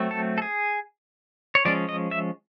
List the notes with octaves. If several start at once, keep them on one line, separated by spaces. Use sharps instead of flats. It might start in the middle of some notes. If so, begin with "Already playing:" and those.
Already playing: F#3 A3 C4
A4
A4
G#4
C#5
F3 G#3 C#4 D5
D#5
E5